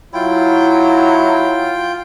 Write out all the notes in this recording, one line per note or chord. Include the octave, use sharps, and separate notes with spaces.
F#3 E4 F4 G5